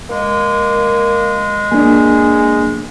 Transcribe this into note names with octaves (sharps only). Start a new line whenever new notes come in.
G#3 A#3
A#3 D4 G#4